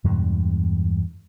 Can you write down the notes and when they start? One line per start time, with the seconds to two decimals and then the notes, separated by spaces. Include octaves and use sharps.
0.04 E2 G2 B2 G#3